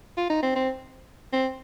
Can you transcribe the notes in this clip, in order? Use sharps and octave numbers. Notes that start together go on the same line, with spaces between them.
F4
D#4
C4
C4
C4